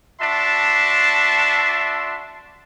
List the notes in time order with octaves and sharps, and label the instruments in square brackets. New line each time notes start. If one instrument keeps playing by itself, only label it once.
[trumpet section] D4 F#4 E5 A5 C6